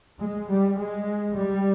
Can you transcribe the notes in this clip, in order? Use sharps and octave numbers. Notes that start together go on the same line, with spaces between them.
G#3
G3
G#3
G3